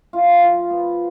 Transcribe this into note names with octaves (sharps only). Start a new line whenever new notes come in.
F4
F3
B3